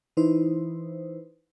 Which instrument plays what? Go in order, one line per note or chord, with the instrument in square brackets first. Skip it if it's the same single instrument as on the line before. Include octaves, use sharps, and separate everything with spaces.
[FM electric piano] E3 D#4 E4 B4 C5